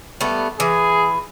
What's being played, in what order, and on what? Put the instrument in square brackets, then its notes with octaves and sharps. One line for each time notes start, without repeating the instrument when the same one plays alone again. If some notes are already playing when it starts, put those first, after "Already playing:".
[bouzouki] G3 A3 B3
[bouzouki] E3 [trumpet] G#4